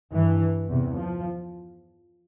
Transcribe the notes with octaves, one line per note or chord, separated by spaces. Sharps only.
G2 E3
E2 C3
F3